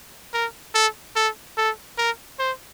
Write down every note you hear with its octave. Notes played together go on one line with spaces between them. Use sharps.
A#4
A4
A4
A4
A#4
C5